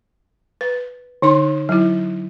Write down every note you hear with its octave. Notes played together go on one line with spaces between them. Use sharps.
B4
D3 D#4 C6
F#3 E4